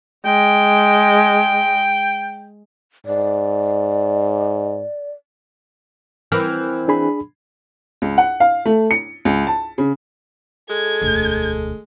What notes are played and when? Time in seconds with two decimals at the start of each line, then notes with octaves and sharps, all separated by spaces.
0.26 G#3 G5
3.06 G#2 D5
6.32 E3 C4 A#4 F6
6.88 D4 G#4 B5
8.02 C#2
8.18 F#5
8.40 F5
8.65 A3
8.91 C#7
9.25 C#2
9.47 A5
9.78 C#3
10.70 G#3 A4 G#6
11.02 E1 D2